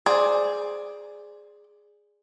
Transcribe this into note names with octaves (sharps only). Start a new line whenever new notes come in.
G#4 C5 D5